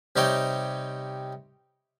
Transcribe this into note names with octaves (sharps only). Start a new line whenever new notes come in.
C3 G3 D#4 C#5 G5